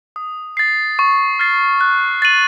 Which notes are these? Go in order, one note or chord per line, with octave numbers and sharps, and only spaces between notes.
D#6
A6 C7
C#6
F6 A6 C7
F#6
A6 D#7 F#7